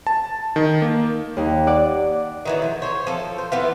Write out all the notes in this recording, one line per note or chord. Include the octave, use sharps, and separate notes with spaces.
A5
D#3
A#3
D#2
D5 F#5 D6
D#3 E3 F#3
F3
C5 C#5
F3 A4
C5
E3 B3 F4